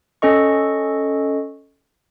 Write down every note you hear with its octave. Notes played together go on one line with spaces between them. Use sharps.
C#4 A4 D#5 C#6